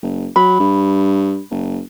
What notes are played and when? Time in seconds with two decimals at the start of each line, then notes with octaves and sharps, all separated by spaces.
0.02 F#1
0.36 F#3 B5
0.60 G2
1.51 F#1